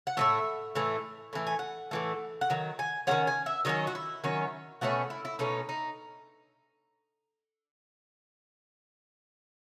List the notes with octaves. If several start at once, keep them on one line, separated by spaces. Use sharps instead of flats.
F#5
A2 E3 A3 E5
A2 E3 A3
A2 E3 A3
G#5
F#5
A2 E3 A3
F#5
D#3 F#3
G#5
D#3 F#3 C#4 F#5
G#5
E5
D#3 F#3 C#4 D#5
F#4
E4
D#3 F#3 C#4
B2 A3 C#4 F#4
E4
E4
B2 A3 C#4 D#4
D#4